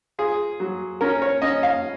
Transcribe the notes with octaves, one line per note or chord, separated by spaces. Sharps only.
F4 G#4
F#3
C#4 A#4
C#5
C#4 D#5
F5